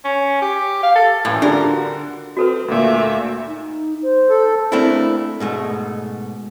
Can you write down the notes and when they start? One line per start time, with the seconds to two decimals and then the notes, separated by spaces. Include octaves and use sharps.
0.05 C#4
0.42 G4
0.83 F5
0.95 A4
1.25 F#2 A2 E3
1.42 D3 G3 D4 F4 A#4
1.68 F#4
2.37 C4 F#4 A4 B4
2.68 D2 A#2 A3 E5
3.48 D#4
4.02 C5
4.29 A4
4.72 A3 A#3 C4 D4 E4
5.40 G#2 B2 A3